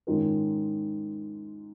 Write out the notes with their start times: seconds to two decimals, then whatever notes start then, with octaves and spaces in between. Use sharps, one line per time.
0.07 G#2 D#3 C#4 F4 A#4